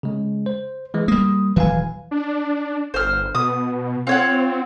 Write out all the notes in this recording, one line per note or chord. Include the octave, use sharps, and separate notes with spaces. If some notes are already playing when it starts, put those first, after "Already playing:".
C#3 G#3
C5
E3 G#3
G3 A#3 D#6
D#1 E3 F#3 B4 F5 G#5
D4
G1 C5 F6
B2 D#6
C4 F4 C#5 F#5